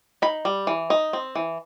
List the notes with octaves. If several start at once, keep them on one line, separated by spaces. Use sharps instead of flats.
D#4 B5
G3
E3
D#4
C4
E3